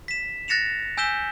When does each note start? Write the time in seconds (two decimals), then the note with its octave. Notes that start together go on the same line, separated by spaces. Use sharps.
0.08 B6 E7
0.48 F#6 A6 A#6 C#7 E7 F7
0.97 G#5 E6 G6 B6 E7 G7